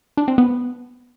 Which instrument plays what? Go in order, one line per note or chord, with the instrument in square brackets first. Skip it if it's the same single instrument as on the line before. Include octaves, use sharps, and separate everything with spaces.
[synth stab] D4
C4
B3